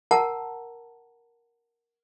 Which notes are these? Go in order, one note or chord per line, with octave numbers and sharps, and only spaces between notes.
A#4 F#5 A5 A#5